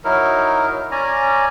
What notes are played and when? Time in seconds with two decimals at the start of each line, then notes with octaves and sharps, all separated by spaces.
0.04 F#3 D#4 E4 A#4
0.91 C#4 D5 G#5 A#5